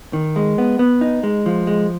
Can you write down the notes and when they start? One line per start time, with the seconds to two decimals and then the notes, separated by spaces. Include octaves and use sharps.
0.13 D#3
0.36 G#3
0.58 B3
0.79 B3
1.01 D#4
1.23 G#3
1.46 F3
1.67 G#3